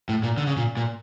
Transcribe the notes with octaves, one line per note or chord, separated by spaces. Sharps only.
A2
A#2
D3
C#3
A#2
A#2